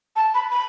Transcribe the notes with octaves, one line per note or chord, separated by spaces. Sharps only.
A5
B5
B5